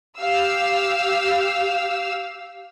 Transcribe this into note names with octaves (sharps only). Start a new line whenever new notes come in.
G4 F5 E6